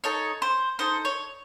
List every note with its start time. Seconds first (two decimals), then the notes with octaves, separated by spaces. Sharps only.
0.04 D#4 A4 C#5
0.42 C5
0.79 D#4 A4 C5
1.05 C#5